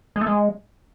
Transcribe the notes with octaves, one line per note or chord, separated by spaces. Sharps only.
G#3
A3
G#3